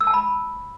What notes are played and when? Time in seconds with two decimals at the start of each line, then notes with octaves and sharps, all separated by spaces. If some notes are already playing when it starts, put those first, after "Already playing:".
0.01 E6
0.07 A5
0.14 B5